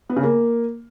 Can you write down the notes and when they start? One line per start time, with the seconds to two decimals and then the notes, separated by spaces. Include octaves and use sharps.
0.09 B3
0.16 C#3
0.23 A#3